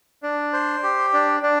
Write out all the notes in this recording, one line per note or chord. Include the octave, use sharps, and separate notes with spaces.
D4
C5
G4
D4
D4